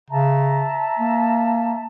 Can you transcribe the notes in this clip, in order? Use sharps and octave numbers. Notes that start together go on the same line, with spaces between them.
C#3 E5 A5 A#5
A#3